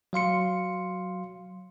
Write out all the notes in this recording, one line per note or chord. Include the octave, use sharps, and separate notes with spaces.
F#3 F5 C6 C#7